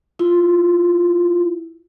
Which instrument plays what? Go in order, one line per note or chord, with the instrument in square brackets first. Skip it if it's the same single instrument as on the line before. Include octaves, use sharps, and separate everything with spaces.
[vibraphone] E4 F4